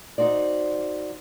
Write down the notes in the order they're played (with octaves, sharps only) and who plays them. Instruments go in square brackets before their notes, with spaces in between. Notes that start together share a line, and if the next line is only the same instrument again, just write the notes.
[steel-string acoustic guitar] D#4 F#4 C5 D5